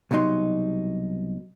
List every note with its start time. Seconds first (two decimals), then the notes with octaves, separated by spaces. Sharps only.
0.11 C2 B2 F#3 D#4 C6